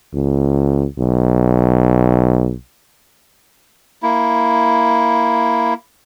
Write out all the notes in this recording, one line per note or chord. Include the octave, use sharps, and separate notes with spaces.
C#2
B1
A#3 E4